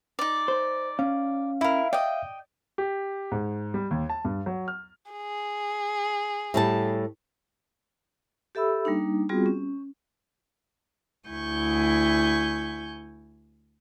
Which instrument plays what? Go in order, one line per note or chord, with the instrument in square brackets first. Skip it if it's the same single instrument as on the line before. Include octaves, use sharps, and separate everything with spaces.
[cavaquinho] D#4 D5
[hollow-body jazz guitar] C5
[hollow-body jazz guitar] C#4 [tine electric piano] F5
[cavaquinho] E4 A#4 [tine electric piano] E5 F5
[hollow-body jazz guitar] D5 [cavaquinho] D#5 G5
[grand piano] G4
G#2
G3
D#2
A5
G2
F#3
F6
[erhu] G#4
[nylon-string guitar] A2 G3 A5
[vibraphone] G4 A4 E5 B5 E6
G3 A#3 D4 D#4
G3 B3 C4 F4 F#4 G#4
C#4
[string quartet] D2 E4 G#5 C#6 G6